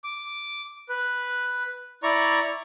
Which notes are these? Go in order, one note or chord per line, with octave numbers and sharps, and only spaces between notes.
D6
B4
E4 D5 A#5 C#6